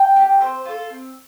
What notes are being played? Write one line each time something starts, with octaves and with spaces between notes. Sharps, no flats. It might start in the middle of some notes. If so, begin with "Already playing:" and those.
Already playing: G5
G4
C4 C5
F4 A4
C4